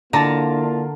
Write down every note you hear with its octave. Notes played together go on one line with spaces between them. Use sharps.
D3 A#3 E4 F4 A5 A#5